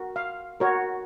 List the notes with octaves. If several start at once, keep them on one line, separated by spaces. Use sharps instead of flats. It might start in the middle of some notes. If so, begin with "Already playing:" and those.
Already playing: F#4 A#4
F5
F#4 A#4 C#5